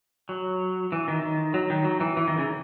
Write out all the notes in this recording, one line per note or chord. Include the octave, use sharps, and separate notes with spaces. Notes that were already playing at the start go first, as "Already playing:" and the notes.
F#3
E3
D#3
D#3
F#3
D#3
F#3
E3
E3
D#3
C#3